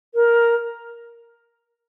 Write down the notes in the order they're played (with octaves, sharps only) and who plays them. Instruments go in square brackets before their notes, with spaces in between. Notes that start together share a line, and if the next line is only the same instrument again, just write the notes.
[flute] A#4